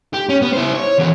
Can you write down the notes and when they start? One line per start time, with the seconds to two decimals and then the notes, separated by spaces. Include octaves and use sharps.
0.14 G4
0.29 C#4
0.42 B3
0.53 E4 C5
0.75 C#5
0.99 E2 F#4